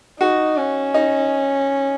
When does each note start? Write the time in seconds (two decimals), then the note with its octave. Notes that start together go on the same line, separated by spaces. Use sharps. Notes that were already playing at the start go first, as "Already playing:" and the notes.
0.20 D#4 F#4
0.58 C#4
0.94 D#4